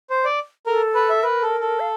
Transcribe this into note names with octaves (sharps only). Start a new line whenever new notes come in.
C5
D5
A4 A#4
B4
E5
A#4 B4
A4
A4
F5